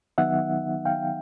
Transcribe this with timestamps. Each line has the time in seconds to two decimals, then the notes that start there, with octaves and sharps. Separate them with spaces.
0.18 D#3 F#3 B3 D#4 E5 F#5
0.85 F5 G5